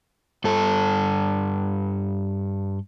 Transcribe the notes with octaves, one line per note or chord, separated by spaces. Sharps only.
G2 A4